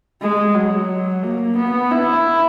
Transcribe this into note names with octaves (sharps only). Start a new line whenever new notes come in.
G#3
F#3
A#3
B3
E4